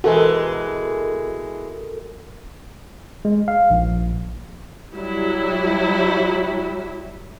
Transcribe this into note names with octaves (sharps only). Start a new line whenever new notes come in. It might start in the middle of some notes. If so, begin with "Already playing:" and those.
B2 E3 G#3 F#4 A4 A#4
G#3
F5
A#1
F#3 G3 E4